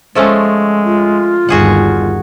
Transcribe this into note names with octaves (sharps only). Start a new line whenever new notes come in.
F3 G#3 A3 C#4
F4
G1 D#2 F#4 G#4 F#5